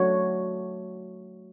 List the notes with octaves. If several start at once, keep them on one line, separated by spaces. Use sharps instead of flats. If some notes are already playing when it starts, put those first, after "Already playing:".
Already playing: F#3 A3 D4 F#4 C#5